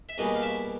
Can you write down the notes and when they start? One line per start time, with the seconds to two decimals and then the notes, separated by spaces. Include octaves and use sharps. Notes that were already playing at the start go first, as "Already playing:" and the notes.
0.09 E5
0.18 E2 B2 G3 A#3 C#4 D#5
0.35 F5
0.42 E5